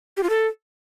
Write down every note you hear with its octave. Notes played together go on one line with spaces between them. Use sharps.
G4
F4
A4